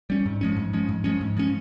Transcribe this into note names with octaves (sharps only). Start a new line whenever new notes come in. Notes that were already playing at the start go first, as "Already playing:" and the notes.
G3 C#4
G#2
F3 G#3 C#4
G#2
F3 G#3 C#4
G#2
F3 G#3 C#4
G#2
F3 G#3 C#4